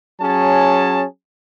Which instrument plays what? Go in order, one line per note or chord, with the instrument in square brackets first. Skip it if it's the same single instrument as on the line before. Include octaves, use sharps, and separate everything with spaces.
[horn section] F#3 C#4 G#4 A5